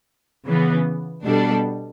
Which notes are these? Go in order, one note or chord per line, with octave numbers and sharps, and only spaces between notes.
C#3 E3 B3
B2 G3 D4 A4